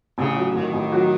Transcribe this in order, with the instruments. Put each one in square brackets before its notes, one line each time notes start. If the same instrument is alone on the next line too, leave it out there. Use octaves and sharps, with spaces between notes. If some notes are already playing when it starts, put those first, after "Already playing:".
[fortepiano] A1 [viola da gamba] C#3
[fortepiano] F#3
[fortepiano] A1 [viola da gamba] D#3
[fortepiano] A1
F#3